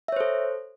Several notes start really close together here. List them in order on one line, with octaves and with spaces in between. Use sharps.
E5 C#5 C5 A4